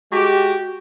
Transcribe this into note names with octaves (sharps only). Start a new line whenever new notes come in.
G#3 F#4 G4